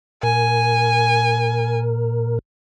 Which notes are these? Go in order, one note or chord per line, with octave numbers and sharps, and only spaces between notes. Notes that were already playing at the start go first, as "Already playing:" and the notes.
A#2 A#4 G#5